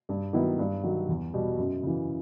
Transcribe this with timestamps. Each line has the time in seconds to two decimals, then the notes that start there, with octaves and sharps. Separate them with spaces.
0.09 G2
0.33 D#3 F#3 B3 E4
0.59 G2
0.83 D#3 F#3
1.09 E2
1.34 B2 G3
1.59 F#2
1.83 C#3 E3